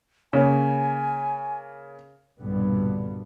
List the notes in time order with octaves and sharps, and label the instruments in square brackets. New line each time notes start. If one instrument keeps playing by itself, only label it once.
[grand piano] C#3 A#3 C#4 [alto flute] G#5
[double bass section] B1 G2 A#2 D3 G3 B3